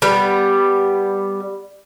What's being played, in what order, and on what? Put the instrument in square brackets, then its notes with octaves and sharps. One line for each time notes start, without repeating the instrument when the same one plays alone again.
[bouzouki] G3 B3